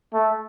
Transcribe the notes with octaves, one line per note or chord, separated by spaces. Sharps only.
A3